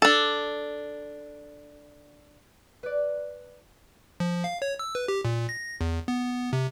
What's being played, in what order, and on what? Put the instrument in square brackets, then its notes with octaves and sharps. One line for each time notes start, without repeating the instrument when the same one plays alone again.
[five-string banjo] D4 A4
[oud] B4 D5
[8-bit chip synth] F3
F5
C#5
E6
B4
G4
A#2
A#6
E2
B3
C3